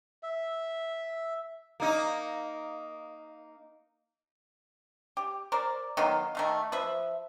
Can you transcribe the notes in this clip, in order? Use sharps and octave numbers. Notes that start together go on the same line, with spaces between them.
E5
A#3 D#4
G4
A#4 C5 D5
D#3 F#3 B3 F4
D#3 A3 F5
F3 B4 E5